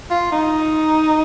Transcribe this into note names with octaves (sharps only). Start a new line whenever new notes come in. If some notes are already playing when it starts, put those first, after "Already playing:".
F4
D#4